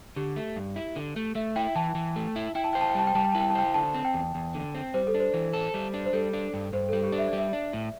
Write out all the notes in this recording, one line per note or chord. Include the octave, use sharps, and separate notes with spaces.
D3 G4
A3
G2
E4
D3
A3
A3 E5
E4 G5
E3 A5
E3
A3
E4
E4 G5
A5
C5 G5
A5
G5
G3 A5
G5
G3 A5
G5
E4 A5
G5
A5
C5 G5
D3 A5
C4
G5
E2
E2
D3
C4
G3 C5
A4
D4
C5
E3
A4
G3
D4
C5
G3 A4
D4
G2
G2 C5
G3 A4
G4
D4
E5
G3 D5
E5
D4
A2